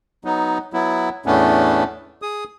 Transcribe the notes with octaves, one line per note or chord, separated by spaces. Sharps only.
F#3 B3 D#4
F#3 B3 E4
E2 A2 A3 B3 C#4 D4
G#4 D#6